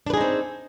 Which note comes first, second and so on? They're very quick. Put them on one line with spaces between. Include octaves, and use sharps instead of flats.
D4 B4 G#4 D#4 C4